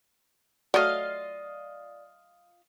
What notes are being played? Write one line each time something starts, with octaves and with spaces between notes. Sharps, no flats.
F#3 A3 F4 D5 D#5 F5